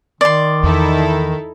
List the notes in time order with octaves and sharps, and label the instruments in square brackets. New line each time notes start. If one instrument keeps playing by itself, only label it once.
[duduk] D#3 [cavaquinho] D5 C6
[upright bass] E2 [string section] D#4 E4 A4